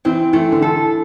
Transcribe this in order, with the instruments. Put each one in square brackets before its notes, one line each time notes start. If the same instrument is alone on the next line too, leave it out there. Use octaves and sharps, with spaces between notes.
[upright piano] E3 [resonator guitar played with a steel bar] C4
[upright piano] E3 [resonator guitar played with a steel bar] A3
[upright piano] D3
[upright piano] E3 [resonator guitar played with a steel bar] A4